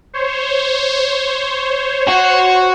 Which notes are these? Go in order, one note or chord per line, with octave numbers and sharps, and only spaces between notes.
C5 C#5
F#4